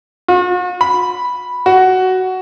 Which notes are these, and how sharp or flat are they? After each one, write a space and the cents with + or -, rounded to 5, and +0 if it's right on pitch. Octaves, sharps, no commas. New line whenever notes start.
F#4 -45
B5 -5
F#4 +10